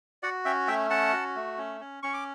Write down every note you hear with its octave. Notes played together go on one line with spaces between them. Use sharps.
F#4 D5 F#5
C#4 E5 G5
A3 E5 G5
C#4 F#5 A5
F#4
A3
C#4
C#4
C#4 C#6
D6